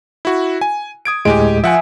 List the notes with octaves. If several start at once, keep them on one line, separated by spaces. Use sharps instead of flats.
E4 F#4
G#5
D#6 G#6 D7
D2 A2 G#3 G4 G#5 D7
F3 E5 F#5 G#5